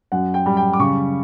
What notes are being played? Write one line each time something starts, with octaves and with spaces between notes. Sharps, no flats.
F#2 F#5
G5
G3
G5
D6
C#3 C#6